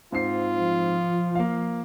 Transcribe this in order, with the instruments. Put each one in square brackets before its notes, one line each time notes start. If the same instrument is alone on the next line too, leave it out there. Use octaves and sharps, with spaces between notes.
[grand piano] G#2 C4 C7 [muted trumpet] F4
[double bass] F3
[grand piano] A#3 F5